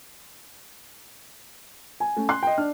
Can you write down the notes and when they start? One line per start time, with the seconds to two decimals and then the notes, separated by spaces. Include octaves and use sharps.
2.00 G#5
2.17 A3 C#4
2.29 C6 F#6 C7
2.43 D#5 G5
2.58 D4 F6